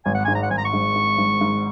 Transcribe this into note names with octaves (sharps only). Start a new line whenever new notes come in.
G#1 G#5
F#5
G#2 G#5
A#5
F#5
G#1 G#5
A#5
C#6
G#2
G#2
G#2
G#2